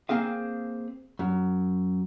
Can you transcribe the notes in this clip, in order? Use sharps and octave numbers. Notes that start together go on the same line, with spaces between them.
A#3 C4 G#4 F5
F#2